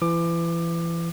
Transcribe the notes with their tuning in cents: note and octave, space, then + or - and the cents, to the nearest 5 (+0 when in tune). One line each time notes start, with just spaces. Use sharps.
E3 +30 D6 +20